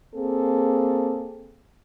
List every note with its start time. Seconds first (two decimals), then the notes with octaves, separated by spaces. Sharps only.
0.14 A#3 C4 G#4 A4